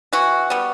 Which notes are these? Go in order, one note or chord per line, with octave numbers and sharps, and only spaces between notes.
E3 F#4
G3 B3